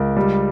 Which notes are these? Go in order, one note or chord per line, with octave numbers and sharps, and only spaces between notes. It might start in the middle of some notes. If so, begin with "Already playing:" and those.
Already playing: C#2 A#4
G3